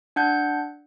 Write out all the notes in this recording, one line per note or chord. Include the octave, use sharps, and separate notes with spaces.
D4 F#5 G6